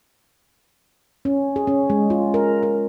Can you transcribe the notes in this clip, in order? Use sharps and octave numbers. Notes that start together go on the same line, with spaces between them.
C#4
G#4
C#4
G#3
F4
A#4
A#4